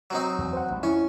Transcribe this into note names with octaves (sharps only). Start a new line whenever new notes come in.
F#3 C4 D#4
E2
C5 F#5
A1 G3
F2 C#4 E4